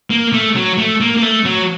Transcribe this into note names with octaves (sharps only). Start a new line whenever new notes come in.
A#3
A3
F#3
A3
A#3
A#3
A3
F#3